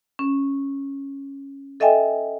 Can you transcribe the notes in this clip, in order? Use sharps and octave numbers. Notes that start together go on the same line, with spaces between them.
C#4
A4 D#5 E5 G5 G#5